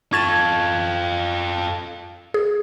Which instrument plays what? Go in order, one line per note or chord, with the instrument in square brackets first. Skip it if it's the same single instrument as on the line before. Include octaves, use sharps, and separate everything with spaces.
[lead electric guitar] F4 A4 [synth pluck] C#6 A6 E7 [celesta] G#6
[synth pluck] G#4